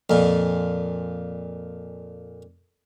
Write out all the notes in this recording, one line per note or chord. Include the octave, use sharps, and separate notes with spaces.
F2 A#2